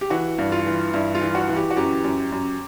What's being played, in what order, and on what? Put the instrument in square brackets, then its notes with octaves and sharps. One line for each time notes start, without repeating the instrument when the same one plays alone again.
[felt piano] G4
E3 F#4
G2
F4
E3
G2 E4
F4
E3
F#4
E3
G4
F#4
F#2 G4
F#2
F#2